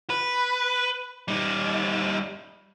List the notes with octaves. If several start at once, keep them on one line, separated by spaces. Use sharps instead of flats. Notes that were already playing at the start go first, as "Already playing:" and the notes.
B4
G3 D#4